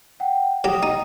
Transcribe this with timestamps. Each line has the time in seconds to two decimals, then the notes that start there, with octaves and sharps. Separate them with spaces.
0.20 F#5 G5
0.64 F#3 G4 G5 D#6
0.83 D#4